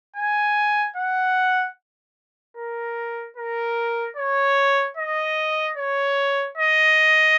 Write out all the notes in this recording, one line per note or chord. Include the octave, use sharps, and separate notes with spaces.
G#5
F#5
A#4
A#4
C#5
D#5
C#5
D#5